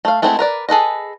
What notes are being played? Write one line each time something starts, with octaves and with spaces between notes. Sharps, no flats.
A3 F5
G#3 A3 B3 C4 E4
A#4 B4 D5
G#4 A4 B4 D#5